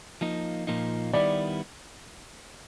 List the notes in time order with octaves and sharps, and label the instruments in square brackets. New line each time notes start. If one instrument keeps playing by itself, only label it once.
[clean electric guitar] F3 A#3 D#4
A#2 F3 A#3 D#4
[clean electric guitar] D#3 G3 B3 E4 [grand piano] D5